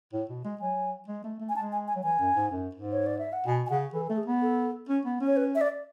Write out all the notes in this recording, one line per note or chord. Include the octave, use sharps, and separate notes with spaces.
A2
B2
G#3
F#3 G#5
G#3
A3
A3
G#5
G#3 A5
G#5
G#5
F#3
E3 G#5
F#2
G#2
F#2
G#2
C#5
D5
E5
F#5
B2 G#5
G#5
C#3 F#5
E3 A4
A3 A4
G#4
B3
A4
C#4
B3
C#4
C#5
B4
E5
D5